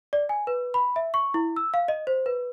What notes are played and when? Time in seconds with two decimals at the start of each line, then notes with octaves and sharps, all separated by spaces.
0.13 D5
0.29 G#5
0.47 B4
0.74 B5
0.96 E5
1.14 C#6
1.34 E4
1.56 E6
1.74 F5
1.88 D#5
2.07 C5
2.26 B4